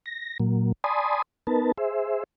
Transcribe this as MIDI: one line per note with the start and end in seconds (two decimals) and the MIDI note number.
0.06 0.38 94
0.40 0.72 46
0.40 0.72 54
0.40 0.72 58
0.84 1.22 74
0.84 1.22 80
0.84 1.22 81
0.84 1.22 83
0.84 1.22 84
0.84 1.22 87
1.47 1.72 59
1.47 1.72 63
1.47 1.72 70
1.47 1.72 71
1.47 1.72 81
1.78 2.24 68
1.78 2.24 72
1.78 2.24 76